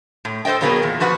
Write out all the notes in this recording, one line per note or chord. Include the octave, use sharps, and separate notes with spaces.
A2
A4 C5 D5 D#5 G5
B2 F#3 A#3 B3 G#4 A#4
E2 A#2
F3 F#4 B4 F#5